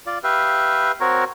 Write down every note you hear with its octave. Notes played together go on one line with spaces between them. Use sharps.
F4 D5
G4 B4 E5 F5
C4 F#4 A#4 C#5